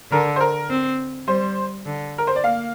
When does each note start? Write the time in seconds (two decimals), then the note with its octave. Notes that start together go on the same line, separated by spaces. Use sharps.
0.11 D3 A#4
0.36 C5
0.40 A#4
0.69 C4
1.28 G3 C5
1.86 D3
2.18 A#4
2.27 C5
2.36 D5
2.43 A#3 F5